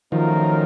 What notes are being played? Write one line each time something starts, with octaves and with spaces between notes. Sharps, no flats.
D#3 F3 F#3 A3 C#4 F4 A#4